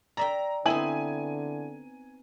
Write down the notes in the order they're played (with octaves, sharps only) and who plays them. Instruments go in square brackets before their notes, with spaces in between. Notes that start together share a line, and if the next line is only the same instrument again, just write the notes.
[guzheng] D5 E5 G5 [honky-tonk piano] A#5
[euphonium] D3 [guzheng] B3 C4 D#4 [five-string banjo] E4 [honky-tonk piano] G#5 F#7